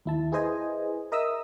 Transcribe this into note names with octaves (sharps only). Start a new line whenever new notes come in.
D#2 E4 A5
E4 G#4 B4 C5 D#5 G#5
A#4 D#5 E5 D#6 E6